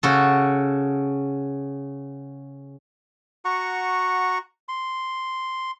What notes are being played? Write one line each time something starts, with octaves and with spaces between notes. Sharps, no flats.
C#3 F#4 A4
F#4 F#5 A#5 C#6
C6